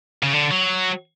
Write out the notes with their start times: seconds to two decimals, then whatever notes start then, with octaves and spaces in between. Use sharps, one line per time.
0.23 C#3
0.34 D3
0.52 F#3